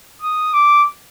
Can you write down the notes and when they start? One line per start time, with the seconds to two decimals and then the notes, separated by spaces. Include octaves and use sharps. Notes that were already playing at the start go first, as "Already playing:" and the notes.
0.22 D#6
0.53 D6